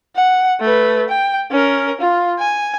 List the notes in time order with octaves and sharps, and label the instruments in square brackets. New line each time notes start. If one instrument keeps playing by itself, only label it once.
[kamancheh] F#5
A3 B4
G5
C#4 A#4
F4
G#5